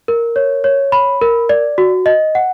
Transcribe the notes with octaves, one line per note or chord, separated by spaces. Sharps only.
A#4
C#5
C#5
B5
A#4
D5
F#4
D#5
F#5